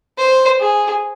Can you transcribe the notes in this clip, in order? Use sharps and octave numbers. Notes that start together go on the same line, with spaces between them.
C5
G#4